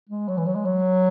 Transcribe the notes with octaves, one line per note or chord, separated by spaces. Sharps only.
G#3
F#3
E3
F#3
G#3
F#3